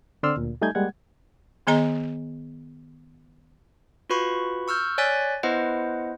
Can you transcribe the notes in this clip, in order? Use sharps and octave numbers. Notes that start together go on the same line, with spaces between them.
D3 C4 D5 C6 E6 F6
D2 A#2
G3 A3 D#4 G#5 G6 G#6
G3 G#3 A#3 F#5 G#6
D#3 B3 G#4 D#5 A#5
F4 F#4 B4 B5 C#6
C#6 E6 F6 G6
C#5 D5 G#5 F#6 A6 B6
B3 E4 B4 C5 D#5 F#5